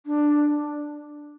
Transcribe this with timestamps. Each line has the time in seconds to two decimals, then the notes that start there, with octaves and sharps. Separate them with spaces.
0.06 D4